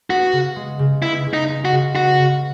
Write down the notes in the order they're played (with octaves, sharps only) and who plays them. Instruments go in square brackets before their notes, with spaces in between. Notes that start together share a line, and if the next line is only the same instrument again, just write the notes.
[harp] B3 [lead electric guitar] F#4
[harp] C#3
G#3
C#3
[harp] B3 [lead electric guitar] E4
[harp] C#3
[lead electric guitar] D#4
[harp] G#3
[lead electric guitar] F#4
[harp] C#3
[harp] B3 [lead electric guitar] F#4
[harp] C#3